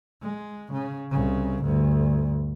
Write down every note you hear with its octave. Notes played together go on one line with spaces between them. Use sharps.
G#3
C#3
C2 C#3
D2 G2